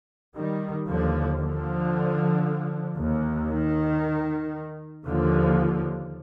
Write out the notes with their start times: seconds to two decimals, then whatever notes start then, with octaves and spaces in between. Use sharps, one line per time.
0.35 D#3 G3
0.87 D#2 D3 F3
1.39 D3 F3
2.97 D#2
3.50 D#3
5.06 D#2 D3 F3